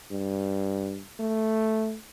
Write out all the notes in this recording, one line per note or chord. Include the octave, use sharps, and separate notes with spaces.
G2
A3